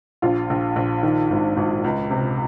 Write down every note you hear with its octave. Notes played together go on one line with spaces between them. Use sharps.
A#1 F4
A#1
A#1
D#3
G#1
G#1
C#2
C3